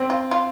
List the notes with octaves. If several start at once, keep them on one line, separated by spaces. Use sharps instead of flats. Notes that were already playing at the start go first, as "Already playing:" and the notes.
Already playing: C4
F4
F4